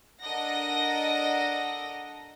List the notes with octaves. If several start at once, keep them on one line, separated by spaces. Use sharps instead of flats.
D4 A4 A#4 D#5 F#5 A#6